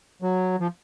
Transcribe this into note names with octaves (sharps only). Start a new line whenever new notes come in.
F#3
F3